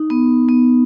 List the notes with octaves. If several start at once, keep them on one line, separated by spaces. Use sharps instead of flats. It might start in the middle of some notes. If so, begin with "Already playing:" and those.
Already playing: D#4
B3
B3